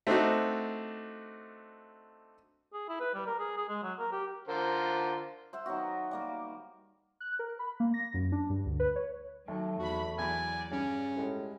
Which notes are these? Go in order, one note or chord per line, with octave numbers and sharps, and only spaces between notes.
A3 C4 D4 D#4 F#4
G#4
E4
B4
G3
A#4
G#4
G#4
G#3
F#3
A#4
G4
D3 F4 A#4 C5
C5 E5 F#5
D#3 F#3 B3 F#4
G3 A#3 A#4
F#6
A#4
B5
A#3
A#6
F#2
D4
G2
D2
B4
C#5
D#2 F#3 A3
E2 F#4 B5
E2 F#3 D5 G#5 B5
G2 C#3 C#4
A2 G3 G#3